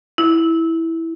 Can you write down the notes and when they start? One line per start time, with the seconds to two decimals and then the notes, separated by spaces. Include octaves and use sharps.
0.18 E4